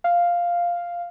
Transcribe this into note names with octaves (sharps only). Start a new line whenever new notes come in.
F5